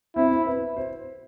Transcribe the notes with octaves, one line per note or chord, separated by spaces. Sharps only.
C4 E4
C4
B4
C5